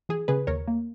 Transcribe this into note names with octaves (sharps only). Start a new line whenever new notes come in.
E3 G#4
C#3 G#4 B4
D#2 A#4 C#5
A#3